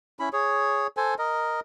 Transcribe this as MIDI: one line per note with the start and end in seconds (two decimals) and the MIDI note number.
0.20 0.29 61
0.20 0.29 64
0.20 0.29 83
0.33 0.87 68
0.33 0.87 73
0.97 1.14 69
0.97 1.14 72
0.97 1.14 80
1.19 1.60 70
1.19 1.60 75